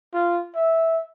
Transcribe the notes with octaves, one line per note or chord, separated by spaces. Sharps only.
F4
E5